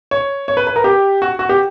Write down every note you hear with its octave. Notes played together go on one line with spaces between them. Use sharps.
C#5
C#5
B4
B4
A#4
G4
F#4
F#4
G4